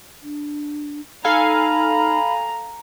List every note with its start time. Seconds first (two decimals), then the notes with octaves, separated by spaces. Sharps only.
0.23 D4
1.24 D#4 A4 F5 G#5 A#5 B5